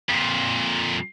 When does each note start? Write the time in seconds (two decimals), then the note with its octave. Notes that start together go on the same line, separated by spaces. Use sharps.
0.09 F2 A#2